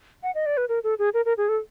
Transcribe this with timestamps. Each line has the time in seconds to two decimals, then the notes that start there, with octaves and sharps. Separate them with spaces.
0.23 F#5
0.35 D#5
0.46 D5
0.57 B4
0.69 A#4
0.84 A4
0.99 G#4
1.14 A#4
1.25 A#4
1.37 G#4
1.49 A4